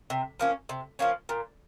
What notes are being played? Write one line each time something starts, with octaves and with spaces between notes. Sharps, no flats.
C3
F3 A#3 C#4
C3
F3 A#3 C#4
A#2